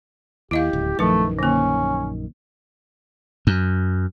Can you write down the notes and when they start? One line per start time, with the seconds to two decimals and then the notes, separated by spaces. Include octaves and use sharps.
0.51 D#2 E4 G4 D#5 F5
0.73 D1 C#2
0.99 A#1 F#2 D#3 F3 A3 B4
1.39 D3 A#3 C#4
3.47 F#2